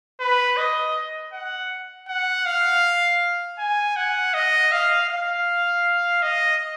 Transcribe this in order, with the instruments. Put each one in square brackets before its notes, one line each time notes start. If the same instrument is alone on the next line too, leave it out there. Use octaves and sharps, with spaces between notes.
[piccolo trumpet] B4
D#5
F#5
F#5
F5
G#5
F#5
D#5
F5
F5
D#5